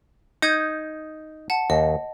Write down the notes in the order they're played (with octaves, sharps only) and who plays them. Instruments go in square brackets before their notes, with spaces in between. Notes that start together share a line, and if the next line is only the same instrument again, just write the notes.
[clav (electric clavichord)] D#4 [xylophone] D#6 G6 G#6
[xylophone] F#5 A5
[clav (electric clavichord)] D#2 [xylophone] D#5